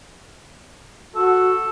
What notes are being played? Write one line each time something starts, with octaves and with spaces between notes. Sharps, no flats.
F#4 A4